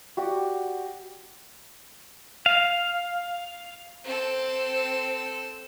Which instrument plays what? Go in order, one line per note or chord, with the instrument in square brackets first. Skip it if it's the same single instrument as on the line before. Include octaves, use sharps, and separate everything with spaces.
[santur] F#4 G4 D5 F#5
[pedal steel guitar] F5
[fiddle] C4 A4